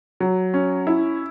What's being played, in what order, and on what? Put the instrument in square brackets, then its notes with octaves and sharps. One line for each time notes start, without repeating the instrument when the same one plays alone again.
[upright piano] F#3
C#4
E4